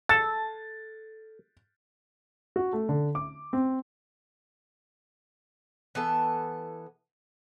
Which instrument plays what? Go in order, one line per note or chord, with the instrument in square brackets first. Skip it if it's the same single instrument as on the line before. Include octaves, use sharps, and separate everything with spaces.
[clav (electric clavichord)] A4 [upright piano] A6
[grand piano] F#4
A3
D3
D6
C4
[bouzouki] E3 B3 A4